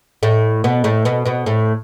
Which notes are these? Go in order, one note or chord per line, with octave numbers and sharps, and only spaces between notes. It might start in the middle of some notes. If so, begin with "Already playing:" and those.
A2 A3
B2 B3
A2 A3
B2 B3
B2 B3
A2 A3